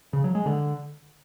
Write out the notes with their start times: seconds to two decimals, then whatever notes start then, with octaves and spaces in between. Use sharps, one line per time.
0.13 C#3
0.24 F#3
0.35 G#3
0.46 D3